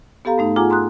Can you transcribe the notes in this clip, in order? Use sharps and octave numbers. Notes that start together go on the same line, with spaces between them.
B3 G4 A4 F5 A#5
G#2 A3 D#4
F4 G#4 F#5 G#5 A#5 D6
A#5 C6 D#6 F#6